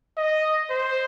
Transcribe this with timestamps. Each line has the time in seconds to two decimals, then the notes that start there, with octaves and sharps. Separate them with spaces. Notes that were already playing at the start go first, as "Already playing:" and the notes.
0.17 D#5
0.70 C5